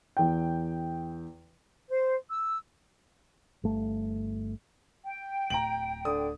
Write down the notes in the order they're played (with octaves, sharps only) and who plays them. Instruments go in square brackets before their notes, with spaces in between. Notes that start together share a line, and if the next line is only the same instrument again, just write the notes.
[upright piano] E2 G5
[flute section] C5
E6
[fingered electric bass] G1 A3
[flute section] G5
[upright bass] D1 [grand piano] A#5 D7 F#7
[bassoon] D3 [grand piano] D#6